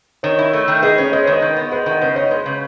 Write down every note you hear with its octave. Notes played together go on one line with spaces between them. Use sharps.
D#3 C#5
E4
A3
D#3
G#4 B4 D#5
C#4 C#5
G#3 B4 D#5
C#5
D#3 B4 D#5
D#3
B3
G#3 B4 D#5
D#3 D#5 F#5
C#3 B4 D#5
D#4 C#5
G#3 B4
C#3